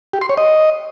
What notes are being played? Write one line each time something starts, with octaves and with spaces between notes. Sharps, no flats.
G4
C6
C#5
D#5